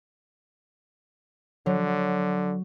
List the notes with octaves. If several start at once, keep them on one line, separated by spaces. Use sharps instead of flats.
D3 F#3